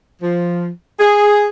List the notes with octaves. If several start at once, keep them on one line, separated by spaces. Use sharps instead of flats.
F3
G#4